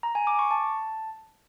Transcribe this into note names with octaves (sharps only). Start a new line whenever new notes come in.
A#5
G#5
D6
C#6
A5